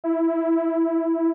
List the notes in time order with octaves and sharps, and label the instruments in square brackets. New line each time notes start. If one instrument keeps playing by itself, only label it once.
[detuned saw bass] E4